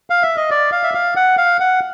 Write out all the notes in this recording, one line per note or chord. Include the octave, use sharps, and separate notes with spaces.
F5
E5
D#5
D5
F5
E5
F5
F#5
F5
F#5